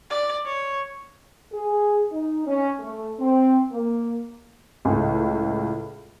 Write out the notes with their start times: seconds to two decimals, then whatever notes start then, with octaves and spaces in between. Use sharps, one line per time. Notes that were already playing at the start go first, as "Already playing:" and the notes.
0.10 D5
0.46 C#5
1.52 G#4
2.12 D#4
2.45 C#4
2.80 A3
3.20 C4
3.71 A#3
4.85 C#2 A2